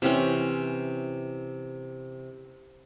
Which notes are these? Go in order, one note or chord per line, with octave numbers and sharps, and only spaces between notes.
C3 E3 C4 C#4